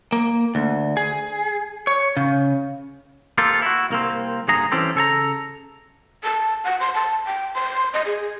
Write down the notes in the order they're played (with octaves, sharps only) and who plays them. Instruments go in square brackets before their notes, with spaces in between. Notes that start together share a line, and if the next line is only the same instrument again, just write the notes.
[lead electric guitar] A#3
D2
G#4
C#5
C#3
[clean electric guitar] A#3 C4 F4 G4 A4
E4 F#4
C2 A#3 C4
G2 D3 G#4 A#5
E3 C4 C#4 G4 A4 C5
C#3 A4 G#5 A#5
[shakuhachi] A5
F#5
C6
A5
G5
C6
D#5
G#4